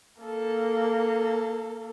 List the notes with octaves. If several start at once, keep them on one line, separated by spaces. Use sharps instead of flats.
A#3 A4